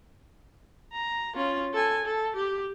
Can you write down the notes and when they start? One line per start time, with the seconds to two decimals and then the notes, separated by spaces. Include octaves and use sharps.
0.93 A#5
1.35 C#4 F4
1.73 A4 G#5
2.06 A4
2.36 G4